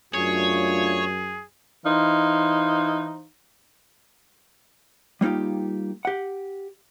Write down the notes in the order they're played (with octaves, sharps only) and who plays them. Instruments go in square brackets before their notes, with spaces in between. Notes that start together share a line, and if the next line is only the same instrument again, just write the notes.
[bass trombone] F#2 [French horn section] A3 D4 F4 [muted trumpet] G#4 [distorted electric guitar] C#5
[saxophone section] E3 D#4 C5 F5
[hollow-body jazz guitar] G3 A#3 D#4 F4 G4
G4 F#5